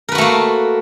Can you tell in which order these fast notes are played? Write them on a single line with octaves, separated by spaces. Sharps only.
A#4 B4 F#4 A3 A#3